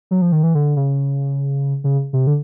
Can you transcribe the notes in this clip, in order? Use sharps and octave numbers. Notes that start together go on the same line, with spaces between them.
F#3
F3
D#3
E3
D3
C#3
C#3
C3
D3